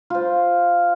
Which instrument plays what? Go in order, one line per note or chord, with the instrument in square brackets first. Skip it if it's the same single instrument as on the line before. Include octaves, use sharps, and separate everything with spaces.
[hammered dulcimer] F4 C5